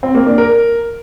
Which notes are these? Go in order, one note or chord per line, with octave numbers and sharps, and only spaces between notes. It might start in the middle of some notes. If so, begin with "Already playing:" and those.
C4
A#3
D4
A#4